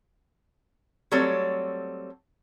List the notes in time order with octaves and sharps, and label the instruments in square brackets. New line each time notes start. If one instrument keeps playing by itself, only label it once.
[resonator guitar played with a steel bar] F#3 G3 A3 C4 A4 C#5